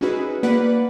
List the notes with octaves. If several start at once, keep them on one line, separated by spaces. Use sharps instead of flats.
C#4 D#4 E4 F#4 G#4 B4
A#3 B4 D5 F#5 B6